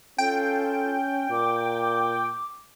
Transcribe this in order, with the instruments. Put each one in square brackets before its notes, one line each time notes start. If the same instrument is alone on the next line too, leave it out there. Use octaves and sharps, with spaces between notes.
[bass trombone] C#4 [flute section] F4 A4 [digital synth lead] G5
[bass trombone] A#2 [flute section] D6